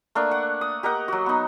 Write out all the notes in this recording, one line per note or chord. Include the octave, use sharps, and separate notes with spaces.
A3 A#3 D4
F#5
D#6
G4 A#4 D#5 F#5
F#3 F#4
B3 D#4